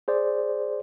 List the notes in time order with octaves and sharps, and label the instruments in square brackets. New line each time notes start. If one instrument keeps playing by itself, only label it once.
[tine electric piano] G#4 C5 D5